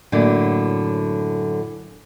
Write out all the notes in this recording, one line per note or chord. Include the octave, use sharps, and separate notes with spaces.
F#2 A2 D3 A#3